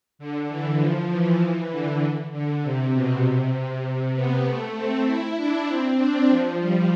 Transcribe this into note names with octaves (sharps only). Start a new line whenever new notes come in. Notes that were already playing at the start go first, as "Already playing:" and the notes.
D3
E3
F3
E3
E3
D3
D3
C3
B2
C3
B3
A3
C4
E4
D4
C4
D4
F3
G3